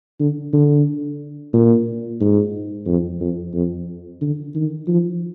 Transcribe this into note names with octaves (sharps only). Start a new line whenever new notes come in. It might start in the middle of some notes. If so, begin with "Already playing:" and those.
D3
D3
A#2
G#2
F2
F2
F2
D3
D#3
F3